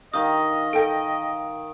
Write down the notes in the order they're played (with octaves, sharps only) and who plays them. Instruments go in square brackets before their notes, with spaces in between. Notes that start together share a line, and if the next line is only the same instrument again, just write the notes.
[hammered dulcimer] D#3 F5 [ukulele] G4 [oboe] D#5 [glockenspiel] D#6
[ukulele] A4 G5 [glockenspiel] D7